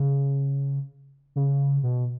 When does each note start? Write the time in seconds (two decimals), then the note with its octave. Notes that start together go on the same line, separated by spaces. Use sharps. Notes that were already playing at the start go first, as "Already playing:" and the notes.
Already playing: C#3
1.36 C#3
1.83 B2